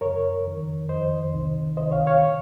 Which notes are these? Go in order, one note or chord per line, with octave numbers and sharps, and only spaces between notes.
F#2 C#3 A#4 C#5
F2 D#3
F2 D#3 C5 D#5
C2 C3 D#3
C#2 C3 D#3 C5 D#5
C#5 F5
C#5 F5
A#2